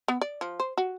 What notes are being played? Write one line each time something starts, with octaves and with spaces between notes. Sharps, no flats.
B3
D5
F3
C5
F#4